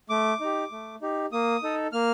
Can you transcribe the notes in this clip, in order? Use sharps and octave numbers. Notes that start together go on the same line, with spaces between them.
A3 D6
D#4 G4
A3
D#4 G4
A#3 D#6
D#4 A4
A#3 F6